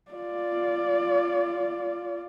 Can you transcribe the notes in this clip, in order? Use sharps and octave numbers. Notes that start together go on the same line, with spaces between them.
F4 D5